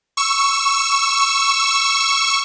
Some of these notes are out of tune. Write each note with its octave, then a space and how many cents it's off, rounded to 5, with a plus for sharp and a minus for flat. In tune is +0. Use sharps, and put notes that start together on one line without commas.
C#6 +0 E6 +5